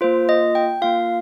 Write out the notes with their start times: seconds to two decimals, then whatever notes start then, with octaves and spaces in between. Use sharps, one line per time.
0.01 A#3 F4 C5
0.29 D#5
0.55 G5
0.82 A#3 F4 F5